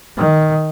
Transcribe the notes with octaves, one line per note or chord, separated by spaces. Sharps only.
D#3